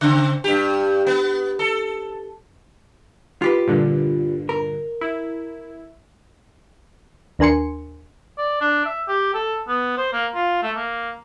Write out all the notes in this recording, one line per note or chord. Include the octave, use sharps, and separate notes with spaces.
C#3 C4
G2 G4
B3
A4
F4 G4 B4
G2 A#2 D3
A#4
E4
D#2 D4 A#4 G#5 C6 C#7
D5
D4
E5
G4
A4
B3
C5
A#3
F4
A3
A#3